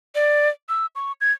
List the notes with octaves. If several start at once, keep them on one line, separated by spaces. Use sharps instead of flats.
D5
E6
C#6
G#6